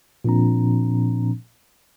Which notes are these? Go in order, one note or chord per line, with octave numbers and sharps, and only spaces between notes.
A#2 F3 C4 D4 A#5